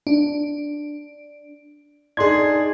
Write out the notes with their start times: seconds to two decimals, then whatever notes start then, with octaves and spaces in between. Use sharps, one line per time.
0.07 D4
2.17 D4 D#4 G#4 C6 G#6